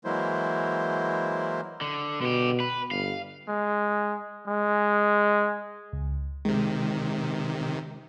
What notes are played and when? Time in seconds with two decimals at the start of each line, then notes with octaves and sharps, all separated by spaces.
0.05 E3 F#3 G#3 A#3 E4 C5
1.81 D3
2.21 B2 D3 G4
2.60 B4
2.91 G1 F5
3.48 G#3
4.47 G#3
5.93 C#2
6.45 C3 D#3 G#3